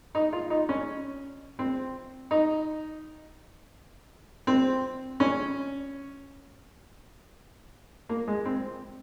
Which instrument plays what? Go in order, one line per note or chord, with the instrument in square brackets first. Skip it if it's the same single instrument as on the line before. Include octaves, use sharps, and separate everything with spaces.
[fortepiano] D#4
F4
D#4
C#4
C4
D#4
C4
C#4
A#3
G#3
C4